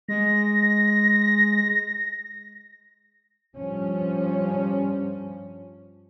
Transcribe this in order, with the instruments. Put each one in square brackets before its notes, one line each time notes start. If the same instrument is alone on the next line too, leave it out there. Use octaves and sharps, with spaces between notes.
[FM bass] G#3 [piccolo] A#6
[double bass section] G2 F3 C#4